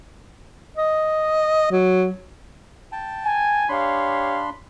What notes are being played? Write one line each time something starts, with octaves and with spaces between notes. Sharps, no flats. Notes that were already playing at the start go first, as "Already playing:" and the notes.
D#5
F#3
G5 A5
G#5
D4 G4 C#5 F5 B5 C6